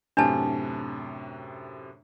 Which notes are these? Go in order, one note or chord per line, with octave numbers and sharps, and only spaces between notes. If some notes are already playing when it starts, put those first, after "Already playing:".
F#2 A2 C3 D4 B4 A5